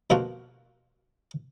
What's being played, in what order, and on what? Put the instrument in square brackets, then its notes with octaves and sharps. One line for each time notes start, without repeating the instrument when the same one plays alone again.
[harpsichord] B2 D3 F3 A#3 F4 F#4